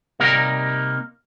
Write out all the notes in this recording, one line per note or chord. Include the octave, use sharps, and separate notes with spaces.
C3 G3 A#3 D#4 A#4